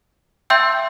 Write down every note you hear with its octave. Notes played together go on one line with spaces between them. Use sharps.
E5 G5 C6 E6 G6